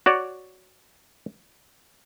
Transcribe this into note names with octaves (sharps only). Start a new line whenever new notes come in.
F#4 C#5 D5